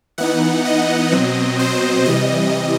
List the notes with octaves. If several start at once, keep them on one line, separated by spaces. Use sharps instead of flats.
E3 B3 D#4 F#5
D#5
B2 F#3 C4
C5
C3 E3 G3 D#5